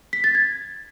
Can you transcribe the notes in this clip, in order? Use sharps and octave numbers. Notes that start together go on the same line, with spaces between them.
B6
A6
G#6